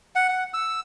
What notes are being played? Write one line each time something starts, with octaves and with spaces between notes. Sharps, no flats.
F#5
F#5
E6